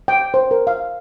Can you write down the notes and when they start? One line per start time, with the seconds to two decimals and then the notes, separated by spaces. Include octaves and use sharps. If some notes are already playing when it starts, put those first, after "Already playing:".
0.08 G5
0.34 C5
0.51 A#4
0.67 F5